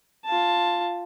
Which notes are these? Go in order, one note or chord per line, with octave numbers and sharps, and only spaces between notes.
F4 A5